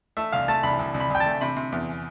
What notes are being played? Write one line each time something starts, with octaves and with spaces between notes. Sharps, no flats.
A3 E5
C2 F5
A3 A5
C2 B5
C2
C2
B5
C2 G5
A5
A3
C3 B5
C3
E2